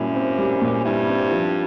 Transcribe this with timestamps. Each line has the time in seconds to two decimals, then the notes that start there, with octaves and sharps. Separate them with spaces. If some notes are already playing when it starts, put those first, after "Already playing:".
Already playing: F#2 A#2 G3 E4
0.15 C4
0.38 G3
0.62 A#2
0.84 G2 E4
1.08 C4
1.31 F3